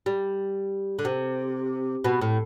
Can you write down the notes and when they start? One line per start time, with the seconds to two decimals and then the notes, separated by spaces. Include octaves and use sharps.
0.06 G3
0.99 D3
1.05 C3
2.04 B2
2.21 A2